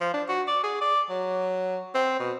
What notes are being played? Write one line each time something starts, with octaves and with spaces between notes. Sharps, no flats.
F3
D4
F#4
D5
G#4
D5
F#3
C4
B2